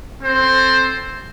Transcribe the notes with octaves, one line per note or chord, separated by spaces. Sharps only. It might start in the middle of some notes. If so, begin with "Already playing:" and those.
C4 A4 C5